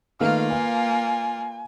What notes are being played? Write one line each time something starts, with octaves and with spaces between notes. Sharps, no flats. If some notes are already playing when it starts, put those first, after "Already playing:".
D#3 A3 A#3 F4 B4 F5
B4 F5 G#5